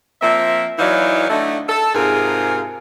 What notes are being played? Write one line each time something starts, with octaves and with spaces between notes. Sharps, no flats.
F3 A#3 C4 E5
E3 F#3 D#4 E4 D5 F5
D3 A3 D#4
A4
G#2 C3 F4 G#4 A#4